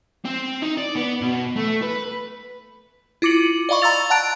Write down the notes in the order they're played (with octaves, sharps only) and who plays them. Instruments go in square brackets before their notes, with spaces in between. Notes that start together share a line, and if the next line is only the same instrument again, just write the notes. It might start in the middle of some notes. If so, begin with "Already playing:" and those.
[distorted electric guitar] C4
D#4
D5
B3
B2
A3
B4
[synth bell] E4 F4 D6 C#7 F#7
D5 D#5 F5 B5 C#6
A#5 C6 E6 A6 F7
F#5 A5 A#5 F#6 A6 D7